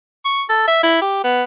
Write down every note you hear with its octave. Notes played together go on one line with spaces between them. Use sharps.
C#6
A4
E5
E4
G4
B3